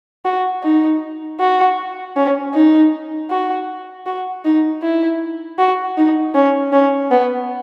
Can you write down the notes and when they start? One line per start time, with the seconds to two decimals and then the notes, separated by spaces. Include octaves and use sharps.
0.25 F#4
0.63 D#4
1.40 F#4
2.16 C#4
2.54 D#4
3.30 F#4
4.06 F#4
4.45 D#4
4.82 E4
5.58 F#4
5.97 D#4
6.35 C#4
6.73 C#4
7.11 B3